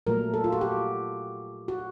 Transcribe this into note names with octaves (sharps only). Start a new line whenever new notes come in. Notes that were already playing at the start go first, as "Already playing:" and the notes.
A#2 F#3 A3 A#4
A4
F4
F#4
G4
F#4